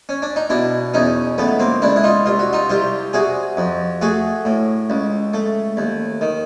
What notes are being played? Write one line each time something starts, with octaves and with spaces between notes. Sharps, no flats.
C#4
D4
D#4
B2 D4 E4
E2 C#4 D#4
C#2 A3 B3
A#3 C4
C#2 D4 E4
E4
D#4 F4
C2 F4
F#4
D#4 F4
C2 F4 G4
C3 F#4 G#4
F2
A3 F#4 G#4
A2
C#2
A3
D#2
D#3